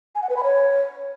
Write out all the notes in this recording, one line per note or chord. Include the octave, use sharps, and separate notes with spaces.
G#5
F#5
B4
B5
C#5